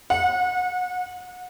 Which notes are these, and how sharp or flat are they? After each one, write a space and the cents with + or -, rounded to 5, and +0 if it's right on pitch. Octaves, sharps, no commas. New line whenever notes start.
F#5 -35